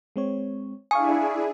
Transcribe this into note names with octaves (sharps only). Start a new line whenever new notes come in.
G#3 C4 C#5
D4 E4 G#4 F5 G#5 C#6 D#6